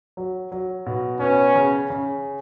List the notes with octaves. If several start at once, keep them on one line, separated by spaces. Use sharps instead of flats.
F#3
F#3
B2
B3 C#4
C#3
C#3